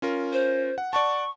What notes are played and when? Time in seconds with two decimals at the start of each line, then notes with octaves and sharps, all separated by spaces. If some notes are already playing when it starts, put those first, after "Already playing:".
0.02 C#4 F4 A#4
0.33 C5
0.78 F#5
0.93 D5 F#5 A5 C#6